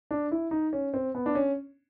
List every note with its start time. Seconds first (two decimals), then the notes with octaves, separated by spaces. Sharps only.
0.11 D4
0.31 E4
0.51 D#4
0.73 C#4
0.94 C4
1.15 B3
1.26 D4
1.35 C#4